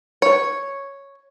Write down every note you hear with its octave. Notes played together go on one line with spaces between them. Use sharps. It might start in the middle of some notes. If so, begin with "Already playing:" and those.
C#5